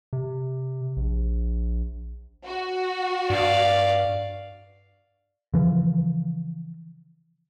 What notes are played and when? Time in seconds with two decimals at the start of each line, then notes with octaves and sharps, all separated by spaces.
0.13 C3
0.97 A#1
2.46 F#4
3.30 G2 D5 F5
5.54 C#3 E3 F3